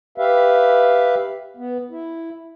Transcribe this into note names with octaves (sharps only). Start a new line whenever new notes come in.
G4 B4 E5 F5
B3
E4